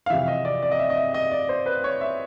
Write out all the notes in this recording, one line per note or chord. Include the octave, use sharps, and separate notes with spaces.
F5
F2 C3 E3 E5
D#5
D5
D5
D#5
E5
D#5
E5
D#5
D5
C5
B4
C#5
E5